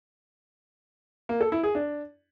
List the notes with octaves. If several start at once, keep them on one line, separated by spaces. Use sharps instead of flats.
A#3
A4
E4
G#4
D4